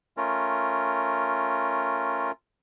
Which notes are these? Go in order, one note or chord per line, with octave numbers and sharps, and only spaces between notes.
A3 C#4 F4 A#4